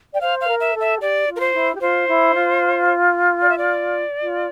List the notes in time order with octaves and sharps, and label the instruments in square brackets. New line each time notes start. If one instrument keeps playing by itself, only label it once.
[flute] D5 [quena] G5
[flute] C5 [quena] F5
[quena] F5
[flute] A#4
[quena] E5
[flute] A4
[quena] E5
[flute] G4 [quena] D5
[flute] F4
[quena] A#4
C5
[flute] E4
G4
[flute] F4 [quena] C5
[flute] E4
F4
[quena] D5
E5
D5
[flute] F4